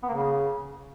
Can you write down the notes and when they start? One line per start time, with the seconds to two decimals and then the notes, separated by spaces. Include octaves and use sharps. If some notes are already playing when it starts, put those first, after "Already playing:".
0.03 B3
0.08 A#3
0.14 C#3